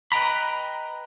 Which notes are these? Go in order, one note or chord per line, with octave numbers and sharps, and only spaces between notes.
B4 D#5 G5 A#5 B5